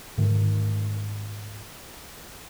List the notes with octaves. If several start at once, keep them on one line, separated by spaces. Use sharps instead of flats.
G#2 D3 D#3 A3